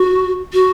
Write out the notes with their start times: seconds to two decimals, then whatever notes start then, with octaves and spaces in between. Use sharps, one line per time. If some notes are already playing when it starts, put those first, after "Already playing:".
Already playing: F#4
0.53 F#4